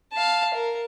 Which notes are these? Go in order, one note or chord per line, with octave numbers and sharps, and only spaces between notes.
F5 A5
A#4